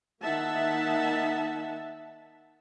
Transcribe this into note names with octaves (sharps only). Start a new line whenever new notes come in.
D#3 A#3 D#4 E5 F#5 A5